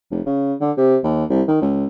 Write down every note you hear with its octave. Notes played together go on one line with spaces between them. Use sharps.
F1
C#3
D3
C3
D#2
C2
D#3
C#2